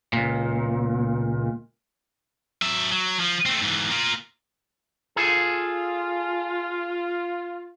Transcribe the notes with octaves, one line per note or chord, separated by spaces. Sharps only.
C#2 A#2
F#3 E5
F#3
F3
A3 C4
G#2 E3
A#3 F4
F4 G#4 A4